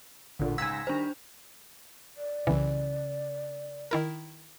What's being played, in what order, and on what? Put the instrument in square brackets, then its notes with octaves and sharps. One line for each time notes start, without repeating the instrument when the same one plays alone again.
[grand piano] D1 D2 [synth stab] A1 A#2 [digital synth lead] D3
[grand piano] C#2 G#2 [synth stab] G#5 E6 [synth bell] G#6 B6 [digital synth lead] A#6
[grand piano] D#3 G3 [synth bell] D4 C5
[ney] D5
[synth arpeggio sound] C2 E3 [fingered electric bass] C#3
[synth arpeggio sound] D#3 E4 A#4